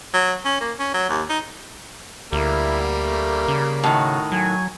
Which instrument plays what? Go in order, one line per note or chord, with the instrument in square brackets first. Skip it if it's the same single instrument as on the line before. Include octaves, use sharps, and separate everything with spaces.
[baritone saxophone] F#3
C#4
A#3
C#4
F#3
D#2
D#4
[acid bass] D2 [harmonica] G3 A#3 [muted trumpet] E4
[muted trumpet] A3
[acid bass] C#3
[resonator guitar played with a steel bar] A2 D#3 [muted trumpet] F#4
[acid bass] F#3 [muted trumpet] G#5